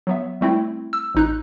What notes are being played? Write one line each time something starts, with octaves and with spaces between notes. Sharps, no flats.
F#3 B3 E5
G3 A3 C4 E4
E6
A1 D#4 F#6